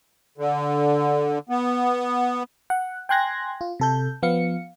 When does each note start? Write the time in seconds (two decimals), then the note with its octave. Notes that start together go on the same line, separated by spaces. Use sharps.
0.38 D3
1.49 B3
2.70 F#5
3.09 G5 G#5 C6 F#6 G#6 A#6
3.61 F4
3.80 C3 A4 G6
4.22 F3 B3 F5 C#7